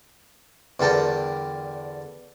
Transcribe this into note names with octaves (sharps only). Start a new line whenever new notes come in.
E2 D3 G3 A4 A#4 G5